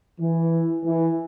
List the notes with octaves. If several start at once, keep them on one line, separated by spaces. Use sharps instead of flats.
E3
E3